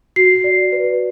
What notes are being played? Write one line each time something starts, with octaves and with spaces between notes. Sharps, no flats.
F#4 C7
D5
B4